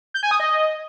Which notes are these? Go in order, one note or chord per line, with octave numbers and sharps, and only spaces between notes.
G6
G#5
D#6
D#5